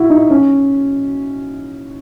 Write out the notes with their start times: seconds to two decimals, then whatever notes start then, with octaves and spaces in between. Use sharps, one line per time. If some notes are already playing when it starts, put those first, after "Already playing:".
Already playing: E4 F#4
0.10 D#4
0.30 C#4